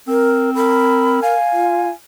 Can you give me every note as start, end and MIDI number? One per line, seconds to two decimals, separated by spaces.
0.08 1.19 60
0.08 0.50 70
0.55 1.34 70
0.55 1.20 83
1.23 1.88 77
1.23 1.91 80
1.53 1.88 65